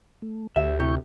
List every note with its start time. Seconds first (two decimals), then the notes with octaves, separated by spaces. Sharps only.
0.22 A3
0.56 D2 G4 E5
0.80 C3 E4 G4 C#6 G6